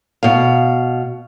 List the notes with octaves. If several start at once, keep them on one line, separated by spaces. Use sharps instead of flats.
B2 F5